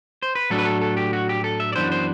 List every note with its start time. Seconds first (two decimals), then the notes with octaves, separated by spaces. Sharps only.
0.23 C5
0.35 B4
0.50 A2 F#3 A3 D4 A4
0.59 B4
0.65 A4
0.81 A4
0.97 G4
1.13 F#4
1.29 G4
1.44 A4
1.60 E5
1.72 D5
1.76 F#2 E3 B3 D4 C5
1.92 C5